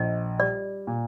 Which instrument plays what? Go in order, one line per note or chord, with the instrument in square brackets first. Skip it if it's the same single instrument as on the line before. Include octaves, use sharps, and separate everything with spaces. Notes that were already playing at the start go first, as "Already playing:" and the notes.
Already playing: [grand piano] A#1 [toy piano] D#5
[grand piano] G3 [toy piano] D5
[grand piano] A#2